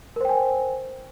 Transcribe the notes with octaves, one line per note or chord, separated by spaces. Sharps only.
A#4 C5 G5 G#5